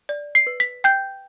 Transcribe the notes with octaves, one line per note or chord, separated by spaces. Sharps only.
D5
C7
B4
B6
G5 G6